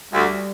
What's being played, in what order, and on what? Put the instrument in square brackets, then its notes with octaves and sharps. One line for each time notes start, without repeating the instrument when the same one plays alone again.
[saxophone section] D2 [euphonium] G3